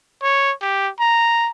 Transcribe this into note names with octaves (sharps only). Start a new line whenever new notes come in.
C#5
G4
A#5